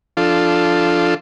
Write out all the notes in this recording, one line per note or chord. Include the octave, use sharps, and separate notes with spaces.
F3 D4 F4 A4